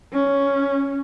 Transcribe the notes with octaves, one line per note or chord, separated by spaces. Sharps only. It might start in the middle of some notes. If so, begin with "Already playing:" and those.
C#4